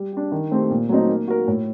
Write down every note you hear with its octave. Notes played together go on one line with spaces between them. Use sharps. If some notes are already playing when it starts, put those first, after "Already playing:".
Already playing: G3
D4 G4
D#3
A3 C4 G4 C5
A#2
F#3 A3 C4 D#4
A#3
F#4 A#4
A2